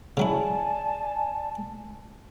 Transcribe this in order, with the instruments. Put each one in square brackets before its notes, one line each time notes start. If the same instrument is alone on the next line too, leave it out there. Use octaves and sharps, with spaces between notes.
[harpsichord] C#3 F#3 E4 [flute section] D5 G#5 A5